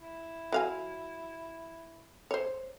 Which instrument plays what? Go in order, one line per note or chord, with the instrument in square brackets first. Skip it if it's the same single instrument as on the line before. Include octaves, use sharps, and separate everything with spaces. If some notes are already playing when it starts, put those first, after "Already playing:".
[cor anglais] E4
[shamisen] F#3 F5 G#5
C5 C#5